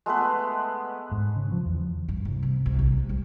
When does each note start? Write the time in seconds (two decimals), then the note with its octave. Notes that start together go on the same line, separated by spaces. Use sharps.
0.06 G#3 A3 B3 B4
1.12 G#2
1.36 C#3
1.52 F3
1.66 E2
2.08 G2
2.25 C2
2.43 C3
2.66 C2
2.79 A#1
2.97 D2
3.09 G3